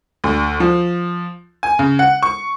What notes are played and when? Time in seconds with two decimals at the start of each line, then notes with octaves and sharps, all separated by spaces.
0.24 D2
0.60 F3
1.63 G#5
1.79 C#3
1.99 F#5
2.23 C#6